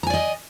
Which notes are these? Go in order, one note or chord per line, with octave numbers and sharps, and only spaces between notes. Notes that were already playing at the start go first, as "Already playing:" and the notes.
D5 D#5 G#5 A#5